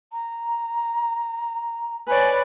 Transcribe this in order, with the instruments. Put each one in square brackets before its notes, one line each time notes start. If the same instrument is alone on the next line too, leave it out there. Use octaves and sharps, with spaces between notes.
[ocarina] A#5
[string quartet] B4 C#5 D5 [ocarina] G#5